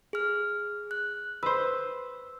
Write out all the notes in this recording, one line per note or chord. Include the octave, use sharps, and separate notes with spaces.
G#4 F6
F#6
B4 C5 E6